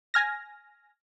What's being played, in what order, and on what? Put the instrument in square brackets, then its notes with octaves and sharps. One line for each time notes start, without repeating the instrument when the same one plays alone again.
[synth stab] G#5 F6 A#6